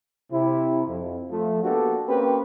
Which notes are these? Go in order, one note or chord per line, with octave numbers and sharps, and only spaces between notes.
C3 E4
F2
F3 A3
A#3 B3 D4 F#4 G4 A4
A#3 C4 C#4 G4 B4